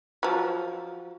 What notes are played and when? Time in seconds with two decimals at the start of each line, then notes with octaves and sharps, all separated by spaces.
0.23 F3 F#3